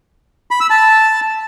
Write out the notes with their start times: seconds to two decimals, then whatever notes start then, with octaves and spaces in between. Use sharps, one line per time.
0.51 B5
0.60 E6
0.70 A5